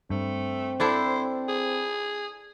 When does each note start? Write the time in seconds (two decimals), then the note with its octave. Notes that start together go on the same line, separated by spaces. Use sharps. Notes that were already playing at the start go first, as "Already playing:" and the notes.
0.10 G2 A3 C4
0.80 D4 E4 A4 C5
1.49 G#4